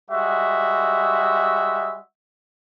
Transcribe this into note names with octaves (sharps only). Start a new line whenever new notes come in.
G3 G#3 F#4 E5